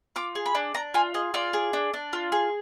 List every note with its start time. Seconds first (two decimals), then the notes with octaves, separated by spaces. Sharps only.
0.16 F4 D6
0.35 G#4
0.46 B5
0.55 D4
0.74 D4 A#5
0.94 F4 G#5
1.14 G#4 D#5
1.34 F4 D5
1.53 G#4
1.73 D4
1.94 D4
2.13 F4
2.32 G#4